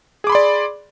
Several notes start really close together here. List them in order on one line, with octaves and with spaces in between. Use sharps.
G#4 D6 B5 C6 D5